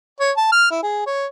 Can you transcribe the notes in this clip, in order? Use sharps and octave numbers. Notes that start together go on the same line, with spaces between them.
C#5
A5
F6
E4
G#4
C#5